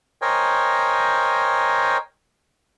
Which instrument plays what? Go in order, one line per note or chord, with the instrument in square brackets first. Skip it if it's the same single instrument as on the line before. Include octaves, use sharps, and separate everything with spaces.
[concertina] A#4 C5 C#5 D#5 G5 G#5